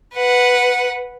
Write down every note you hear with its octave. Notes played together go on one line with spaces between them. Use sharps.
B4 F#5